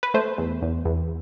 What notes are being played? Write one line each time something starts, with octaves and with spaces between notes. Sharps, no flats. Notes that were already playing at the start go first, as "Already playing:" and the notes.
B4
A3 C5
E2
E2
E2